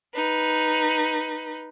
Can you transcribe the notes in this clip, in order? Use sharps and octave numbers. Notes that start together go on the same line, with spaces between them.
D#4 B4